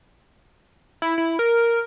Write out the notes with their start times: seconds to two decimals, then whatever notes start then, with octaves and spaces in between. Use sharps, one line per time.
1.02 E4
1.18 E4
1.39 A#4